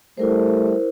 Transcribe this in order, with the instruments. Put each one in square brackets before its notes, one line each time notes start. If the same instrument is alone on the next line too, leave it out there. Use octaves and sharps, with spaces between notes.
[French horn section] G3 A3 [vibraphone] E4 A#4 C5